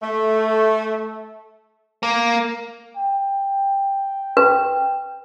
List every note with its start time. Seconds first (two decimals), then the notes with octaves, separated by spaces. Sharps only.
0.02 A3
2.03 A#3
2.97 G5
4.37 B4